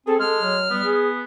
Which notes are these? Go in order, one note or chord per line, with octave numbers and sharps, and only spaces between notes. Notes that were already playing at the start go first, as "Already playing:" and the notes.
C4 G#4 A4
G#3 A4 F6
F#3
G3 B3
G#4